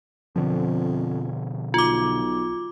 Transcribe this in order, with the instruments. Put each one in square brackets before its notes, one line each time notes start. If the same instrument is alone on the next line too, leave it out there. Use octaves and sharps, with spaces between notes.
[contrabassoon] F2 [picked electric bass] B2 D3 F3
[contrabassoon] B1 [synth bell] F4 D6